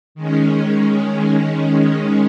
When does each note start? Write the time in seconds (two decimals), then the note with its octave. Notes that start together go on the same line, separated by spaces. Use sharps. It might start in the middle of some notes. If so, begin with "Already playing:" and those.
0.15 D#3 G#3 C#4